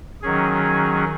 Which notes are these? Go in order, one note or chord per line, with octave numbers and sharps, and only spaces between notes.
D#3 F#3 C#4 G#4